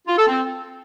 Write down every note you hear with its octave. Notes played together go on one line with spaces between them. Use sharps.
F4
A4
C4